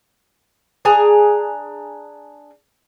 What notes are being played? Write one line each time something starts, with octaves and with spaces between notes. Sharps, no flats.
D4 G#4 G#5 A#5